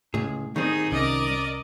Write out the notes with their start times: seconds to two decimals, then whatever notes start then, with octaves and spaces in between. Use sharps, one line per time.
0.14 C#2 A2 G#4
0.56 D#3 G3 C4 D#4 G#4
0.92 C2 C#4 A#4 D5 D#5